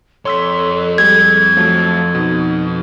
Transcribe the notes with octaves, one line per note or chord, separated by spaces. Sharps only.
F2 A4 C#5 C6 E6 B6
G3 G#3 G#6
F3 F#3 A3 A4
B2 D#4